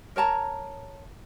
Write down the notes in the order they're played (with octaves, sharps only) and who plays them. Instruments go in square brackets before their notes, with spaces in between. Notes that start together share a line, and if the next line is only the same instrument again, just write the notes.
[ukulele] A#4 C#5 A5 A#5